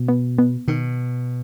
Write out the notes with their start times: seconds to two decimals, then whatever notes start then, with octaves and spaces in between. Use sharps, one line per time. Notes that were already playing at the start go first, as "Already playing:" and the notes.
Already playing: B2
0.08 B3
0.38 B3
0.68 B2 D#3